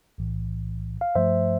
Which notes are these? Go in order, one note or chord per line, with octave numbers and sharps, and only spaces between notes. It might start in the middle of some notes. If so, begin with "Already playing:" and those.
B1 A2 E3
F5
G2 F3 A3 C5 E5